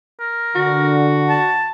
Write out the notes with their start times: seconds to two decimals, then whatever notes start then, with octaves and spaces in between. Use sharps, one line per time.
0.20 A#4
0.55 D3 F#4
1.29 A5